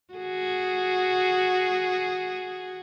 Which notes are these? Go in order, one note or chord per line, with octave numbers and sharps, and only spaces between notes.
F#4 G#4